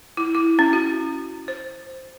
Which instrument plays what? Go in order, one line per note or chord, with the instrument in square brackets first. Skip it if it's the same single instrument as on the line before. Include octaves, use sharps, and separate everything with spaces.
[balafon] E4
E4
C#4
F#4
C5